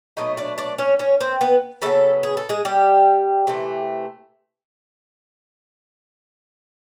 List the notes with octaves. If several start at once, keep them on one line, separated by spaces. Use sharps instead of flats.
B2 F#3 A3 D#4 D#5
D4 D5
D4 D5
C#4 C#5
C#4 C#5
C4 C5
B3 B4
C#3 F#3 A3 B3 A4
G#4
A4
G#3 G#4
G3 G4
C3 E3 A3